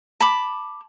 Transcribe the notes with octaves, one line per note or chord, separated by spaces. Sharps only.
A5 B5 D6